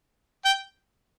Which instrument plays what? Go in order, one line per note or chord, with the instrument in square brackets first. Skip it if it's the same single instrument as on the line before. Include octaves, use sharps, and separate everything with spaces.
[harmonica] G5